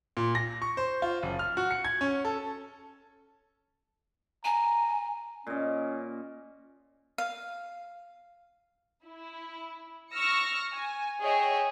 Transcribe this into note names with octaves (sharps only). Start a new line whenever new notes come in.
A#2
A#6
C#6
C5
F4
F#1
F6
F#4
C#7
G#6
C#4
A4
G#5 A#5
A#2 C#4 D#5
F5
E4
C#6 E6 F6 A#6 C#7
G#5
G#4 C#5 D#5 E5 G5